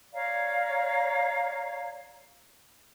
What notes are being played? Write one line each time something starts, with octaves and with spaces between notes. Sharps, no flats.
C#5 D5 F5 A#5